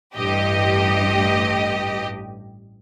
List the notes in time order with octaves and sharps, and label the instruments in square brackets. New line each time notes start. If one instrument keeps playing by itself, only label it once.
[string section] A1 G2 G4 D#5